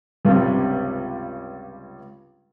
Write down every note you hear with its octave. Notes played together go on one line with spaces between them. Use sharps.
C#2 G2 C3